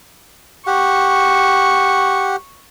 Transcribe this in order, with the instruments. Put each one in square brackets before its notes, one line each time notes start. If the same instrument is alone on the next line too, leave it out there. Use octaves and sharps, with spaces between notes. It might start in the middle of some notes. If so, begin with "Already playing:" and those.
[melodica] G4 F#5 [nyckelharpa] C#6